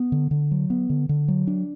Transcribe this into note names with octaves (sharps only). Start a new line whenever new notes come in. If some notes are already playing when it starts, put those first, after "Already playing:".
Already playing: B3
D3
D3
F#3
B3
D3
D3
F#3
D4